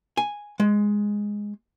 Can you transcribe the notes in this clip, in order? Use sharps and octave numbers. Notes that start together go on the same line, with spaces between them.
G#5
G#3